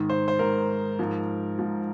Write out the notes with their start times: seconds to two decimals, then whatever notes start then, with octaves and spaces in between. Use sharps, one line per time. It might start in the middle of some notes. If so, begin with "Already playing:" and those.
Already playing: G#2 D#3
0.10 C5
0.28 C5
0.39 G#2 D#3 A#4
0.99 G#2 F3
1.59 G#2 F3